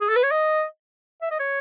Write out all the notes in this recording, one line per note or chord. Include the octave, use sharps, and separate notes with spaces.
G#4
A4
B4
C#5
D#5
E5
D#5
C#5